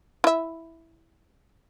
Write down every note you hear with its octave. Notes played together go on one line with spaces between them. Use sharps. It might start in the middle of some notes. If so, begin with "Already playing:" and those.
E4 E5